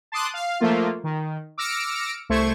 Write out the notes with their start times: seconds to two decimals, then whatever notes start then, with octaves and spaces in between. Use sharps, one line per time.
0.12 A5 C6 D6 D#6 F#6
0.34 F5
0.60 F3 A3 A#3 F4
1.04 D#3
1.58 D6 E6 F6 A#6 C#7 D7
2.29 C2 A3 C5 C#6 G#6